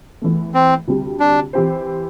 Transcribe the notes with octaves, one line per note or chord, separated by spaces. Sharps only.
E2 E3 A3
C4
D2 C3 G3
D4
E3 C4 G4 C5